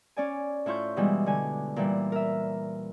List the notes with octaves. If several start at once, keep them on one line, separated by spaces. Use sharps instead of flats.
C#4 D5 G#5
A2 E4 F4 C#6 G6
B2 E3 G3 G#3
D3 G#5
A#2 E3 G3
A#4 E5